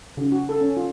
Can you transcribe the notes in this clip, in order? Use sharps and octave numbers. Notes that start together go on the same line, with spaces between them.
C#3
F#4
A4
C#4
F4